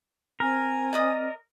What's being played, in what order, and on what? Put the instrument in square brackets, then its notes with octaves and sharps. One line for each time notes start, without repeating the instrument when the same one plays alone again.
[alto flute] C4 [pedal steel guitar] A#4 [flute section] G#5
[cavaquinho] D5 D#5 D#6